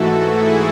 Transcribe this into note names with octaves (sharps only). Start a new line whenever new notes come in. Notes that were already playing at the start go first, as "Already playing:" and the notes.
Already playing: G#2 E3 A3 F#4 A4
E4 G#4